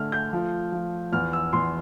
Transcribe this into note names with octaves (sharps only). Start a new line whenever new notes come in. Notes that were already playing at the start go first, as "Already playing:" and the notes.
Already playing: D3 A3 F6
G6
F3
F3
E2 F6
E6
E2 C6